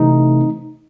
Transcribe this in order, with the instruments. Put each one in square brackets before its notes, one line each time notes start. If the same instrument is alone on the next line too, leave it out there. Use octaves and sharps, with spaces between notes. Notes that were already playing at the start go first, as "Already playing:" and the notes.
Already playing: [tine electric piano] C3 E3 A3 C4 D#4